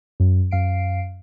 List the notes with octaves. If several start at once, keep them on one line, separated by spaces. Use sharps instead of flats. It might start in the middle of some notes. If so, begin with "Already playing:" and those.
F#2
F#2 F5 C7 D7